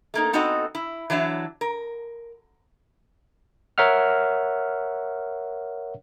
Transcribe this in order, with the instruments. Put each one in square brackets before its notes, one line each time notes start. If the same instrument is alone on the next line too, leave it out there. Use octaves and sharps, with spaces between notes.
[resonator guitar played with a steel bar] A3 A#3 D#4
B3 C4 D#4 F#4 A4 D#5
E4
E3 F#3 D4 E5
A#4
[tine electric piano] A#4 C#5 E5 F#5 F6